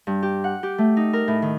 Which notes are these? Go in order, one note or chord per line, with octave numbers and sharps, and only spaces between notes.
G2
G4
F#5
G4
A3
D#4
A#4
A2
D#3